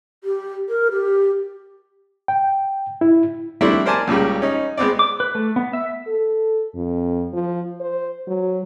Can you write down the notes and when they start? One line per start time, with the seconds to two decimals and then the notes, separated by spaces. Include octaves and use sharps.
0.24 G4
0.69 A#4
0.91 G4
2.28 G5
3.01 E4
3.61 G3 A3 C4 D4 E4
3.86 A#4 C5 D5 G#5 A5
4.07 C#2 A#2 C#3 G3
4.42 C#4 D#4
4.77 G#3 B3 C4 D5
4.99 D6
5.20 B4
5.35 A3
5.56 B3
5.73 E5
6.07 A4
6.75 F2
7.33 F3
7.80 C5
8.27 F#3